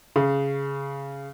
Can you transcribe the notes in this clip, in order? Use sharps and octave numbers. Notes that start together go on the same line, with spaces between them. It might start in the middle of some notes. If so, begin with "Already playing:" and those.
C#3